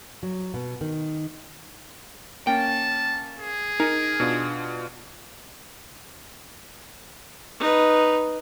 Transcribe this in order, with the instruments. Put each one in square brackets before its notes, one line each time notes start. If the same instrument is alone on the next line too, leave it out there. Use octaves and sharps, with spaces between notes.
[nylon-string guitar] F#3
B2
D#3
[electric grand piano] A#3 C#4 [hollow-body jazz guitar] G5 [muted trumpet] A5
[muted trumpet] G#4
[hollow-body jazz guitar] D#4 [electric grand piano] A#4 G#5
[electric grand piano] B2 D4 F4
[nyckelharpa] D#4 B4